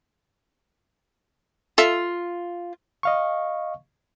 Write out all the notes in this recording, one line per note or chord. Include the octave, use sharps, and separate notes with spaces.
F4 A4 E5
D#5 F5 C#6